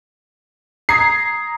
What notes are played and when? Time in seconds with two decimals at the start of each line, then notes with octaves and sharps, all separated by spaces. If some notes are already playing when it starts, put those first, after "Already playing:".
0.89 A#5 D#6 G#6 C7